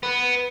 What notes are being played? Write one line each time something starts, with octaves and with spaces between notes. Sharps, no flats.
B3